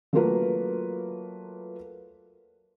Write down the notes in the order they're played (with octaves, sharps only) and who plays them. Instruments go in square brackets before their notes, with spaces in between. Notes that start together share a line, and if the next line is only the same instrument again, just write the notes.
[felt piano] F#3 A3 A#3 F4 A#4 B4